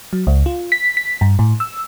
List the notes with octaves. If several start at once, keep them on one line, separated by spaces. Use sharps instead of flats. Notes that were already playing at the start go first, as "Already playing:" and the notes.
F#3
C#2
F4
B6
B6
G2
A2
E6